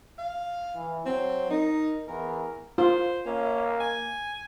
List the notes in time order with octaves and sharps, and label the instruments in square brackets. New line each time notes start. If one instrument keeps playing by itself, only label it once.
[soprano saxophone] F5
[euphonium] E3
[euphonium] F#3 [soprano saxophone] C4
[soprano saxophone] D#4 [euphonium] A#4
[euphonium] E2 [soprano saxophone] A#4
[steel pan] F4 [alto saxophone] C5
[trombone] A#3 [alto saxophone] C#4
[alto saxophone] G#5